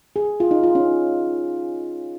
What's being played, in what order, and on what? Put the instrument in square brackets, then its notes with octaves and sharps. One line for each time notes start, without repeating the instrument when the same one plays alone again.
[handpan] G#4
F4
D#4
F4
C#4